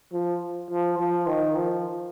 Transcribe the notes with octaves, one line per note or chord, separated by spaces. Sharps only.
F3
F3
F3
D#3
F3